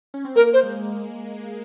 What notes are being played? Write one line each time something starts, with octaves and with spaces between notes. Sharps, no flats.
C#4
C4
A#3 A#4
C5
G#3